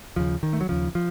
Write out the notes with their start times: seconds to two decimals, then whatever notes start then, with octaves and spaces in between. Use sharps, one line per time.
0.16 D#2 C#3 F3
0.43 D#3
0.53 A3
0.61 F#3
0.69 D#2 C#3 F3
0.95 F3